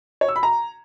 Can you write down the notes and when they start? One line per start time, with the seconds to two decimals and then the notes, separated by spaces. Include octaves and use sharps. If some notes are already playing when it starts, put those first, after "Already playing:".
0.21 C#5
0.28 E6
0.36 B5
0.43 A#5